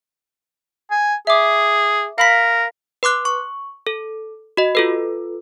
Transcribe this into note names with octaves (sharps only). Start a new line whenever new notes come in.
G#5
G#4 E5 D6
A#4 F5 B5 B6
B4 C6 D6 F#6
C#6
A4
F#4 D#5
F4 A4 B4